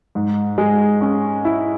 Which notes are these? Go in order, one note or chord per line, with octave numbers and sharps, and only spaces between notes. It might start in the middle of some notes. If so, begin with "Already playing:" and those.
G#2
G#3
C#4
E4